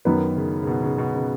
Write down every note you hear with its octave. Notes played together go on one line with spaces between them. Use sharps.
F#2 D#3 F#3 B3
C#3
C#3
B2
C#3
B2
C#3